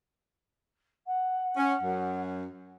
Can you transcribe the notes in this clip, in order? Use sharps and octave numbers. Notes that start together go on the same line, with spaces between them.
F#5
C#4
F#2